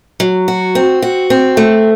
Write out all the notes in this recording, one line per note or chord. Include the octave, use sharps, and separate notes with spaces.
F#3
F#4
C4
F#4
C4
A3